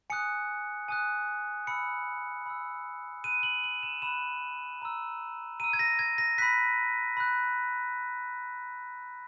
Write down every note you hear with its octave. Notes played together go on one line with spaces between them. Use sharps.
G#5 D#6 F#6 C#7
G#5 D#6 F#6
B5 E6 C#7
B5 E6
B5 F#6 D#7
F#7
F#7
E7
B5 F#6 E7
A#5 E6
A#5 E6 D#7
G#6
A#6
G#6
A#6
B5 F#6 B6
B5 F#6